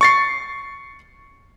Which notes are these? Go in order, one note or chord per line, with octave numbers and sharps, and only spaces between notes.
C#6 A6 C7